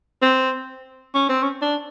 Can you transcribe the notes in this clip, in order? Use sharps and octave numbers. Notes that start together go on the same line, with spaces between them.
C4
C#4
C4
C#4
D4